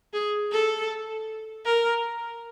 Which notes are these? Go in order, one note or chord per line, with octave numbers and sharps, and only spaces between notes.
G#4
A4
A#4